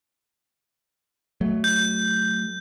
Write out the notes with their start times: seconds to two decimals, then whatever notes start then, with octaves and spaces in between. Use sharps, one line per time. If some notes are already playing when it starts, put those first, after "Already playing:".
1.41 F#3 A3
1.64 G6